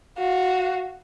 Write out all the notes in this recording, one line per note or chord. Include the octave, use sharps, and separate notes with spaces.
F#4 F5